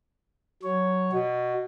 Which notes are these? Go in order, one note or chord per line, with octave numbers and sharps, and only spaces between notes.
F#3 C#5
B2 F#4